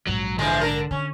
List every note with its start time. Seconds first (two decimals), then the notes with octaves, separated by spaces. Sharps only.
0.07 A#1 G#2 F#3
0.39 D3 E3 F3 G#3
0.61 D4 A#4
0.91 D3 C#4